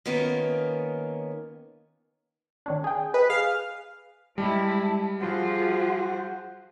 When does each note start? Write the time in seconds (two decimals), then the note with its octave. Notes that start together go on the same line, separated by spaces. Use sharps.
0.06 D#3 A#3 B3 C#4 F4 A#4
2.66 D#3 C#4 D4
2.84 G#4 G5
3.14 B4 D#5
3.30 G#4 F5
4.38 G3 G#3 E4 A5
5.20 F3 F4 F#4 G#4 C5 F#5